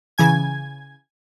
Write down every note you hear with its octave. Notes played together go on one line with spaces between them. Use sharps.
C#3 E3 G#5 G#6